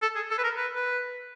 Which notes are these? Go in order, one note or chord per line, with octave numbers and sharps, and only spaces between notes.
A4
G#4
A4
B4
A#4
B4
B4